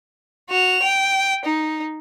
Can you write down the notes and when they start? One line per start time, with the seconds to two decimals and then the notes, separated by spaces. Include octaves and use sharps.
0.50 F#4 F7
0.83 G5
1.45 D#4